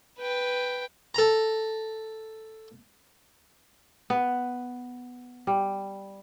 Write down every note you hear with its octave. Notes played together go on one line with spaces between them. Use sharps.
B4 G5
A4 A#5
B3
G3